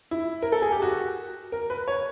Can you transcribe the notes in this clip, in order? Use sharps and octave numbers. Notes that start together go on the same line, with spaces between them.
E4
A#4
A4
G#4
G4
F#4
A#4
B4
C#5